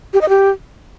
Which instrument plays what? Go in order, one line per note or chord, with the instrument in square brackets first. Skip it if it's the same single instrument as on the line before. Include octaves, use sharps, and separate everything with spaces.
[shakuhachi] G4
D#5
G4